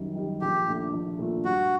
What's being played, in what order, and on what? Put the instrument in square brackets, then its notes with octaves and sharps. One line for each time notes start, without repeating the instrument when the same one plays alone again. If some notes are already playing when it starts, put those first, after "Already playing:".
Already playing: [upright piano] F#2 D#3 G3
D#3 G3
[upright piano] A#1 [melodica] G4
[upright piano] A#2 A3 D4
A#1
A#2 A3 D4
[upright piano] G2 [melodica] F#4